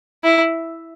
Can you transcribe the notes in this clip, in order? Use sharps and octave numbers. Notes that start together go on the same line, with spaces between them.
E4